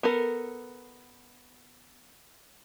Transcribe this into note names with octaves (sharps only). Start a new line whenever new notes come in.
B3 A4 A#4